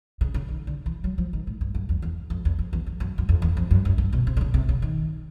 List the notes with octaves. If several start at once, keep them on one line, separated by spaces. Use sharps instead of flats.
C#3
C#3
D#3
D3
E3
F#3
F3
D#3
A2
G2
F#2
E2
E2
F2
E2
F2
E2
F2
F#2
F#2
F2
E2
F2
F#2
F#2
G2
B2
C3
D3
C#3
C3
C#3
D#3